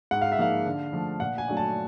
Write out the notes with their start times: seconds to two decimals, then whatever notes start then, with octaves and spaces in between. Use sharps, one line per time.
0.11 G#2 F#5
0.21 F5
0.32 E5
0.38 F3 A#3 D#4 F5
0.66 D3
0.93 F3 A3
1.20 A#2 F#5
1.38 G#5
1.48 F#3 A3 D4
1.57 A5